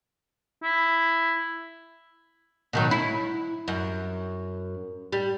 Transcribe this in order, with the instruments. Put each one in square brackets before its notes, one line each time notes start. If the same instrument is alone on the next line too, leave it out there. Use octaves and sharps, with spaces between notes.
[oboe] E4
[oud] B2 D#3 F#3
E4
F#2
G3